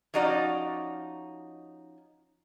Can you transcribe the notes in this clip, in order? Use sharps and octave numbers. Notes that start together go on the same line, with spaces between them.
F3 C#4 D#4 F#4 D5